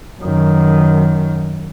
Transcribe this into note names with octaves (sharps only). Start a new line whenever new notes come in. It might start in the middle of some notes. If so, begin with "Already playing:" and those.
F#2 D#3